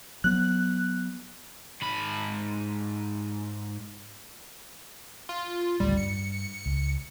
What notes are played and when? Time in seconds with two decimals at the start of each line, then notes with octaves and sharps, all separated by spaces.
0.24 F#3 B3 F#6
1.82 G#2 B5
5.29 F4
5.80 A1 D2 C#3 G3
5.97 G2 C#7
6.66 C#2